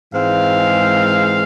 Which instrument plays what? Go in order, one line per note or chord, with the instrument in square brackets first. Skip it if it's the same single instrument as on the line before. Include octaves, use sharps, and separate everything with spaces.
[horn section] G#2 E3 G#3 C4 F5